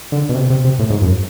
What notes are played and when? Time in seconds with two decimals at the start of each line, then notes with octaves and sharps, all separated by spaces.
0.12 D3
0.29 B2
0.35 C3
0.50 C3
0.65 C3
0.79 A2
0.90 G#2
1.01 F#2